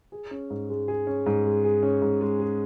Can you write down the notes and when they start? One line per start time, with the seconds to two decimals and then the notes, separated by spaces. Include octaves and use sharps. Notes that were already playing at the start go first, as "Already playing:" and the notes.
0.12 G#4
0.31 C#4
0.50 G#2
0.69 G#3
0.88 G#4
1.07 C#4
1.26 G#2
1.45 G#3
1.64 G#4
1.83 C#4
2.02 G#2
2.21 G#3
2.40 G#4